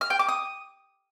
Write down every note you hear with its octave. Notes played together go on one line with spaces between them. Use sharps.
F6
G5
D6
D#6